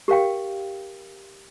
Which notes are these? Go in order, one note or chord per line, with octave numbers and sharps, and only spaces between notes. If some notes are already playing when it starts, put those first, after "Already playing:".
G4 A#4 F5 G5